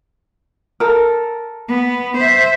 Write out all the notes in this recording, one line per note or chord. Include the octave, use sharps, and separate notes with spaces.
A4 A#4
B3
C5 E5